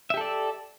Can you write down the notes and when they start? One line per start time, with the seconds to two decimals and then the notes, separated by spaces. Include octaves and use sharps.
0.10 E5
0.14 G4
0.17 A4
0.21 D5